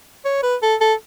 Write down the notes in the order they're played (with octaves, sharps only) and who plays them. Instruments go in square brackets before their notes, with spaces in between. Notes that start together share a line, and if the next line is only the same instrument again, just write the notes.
[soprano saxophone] C#5
B4
A4
A4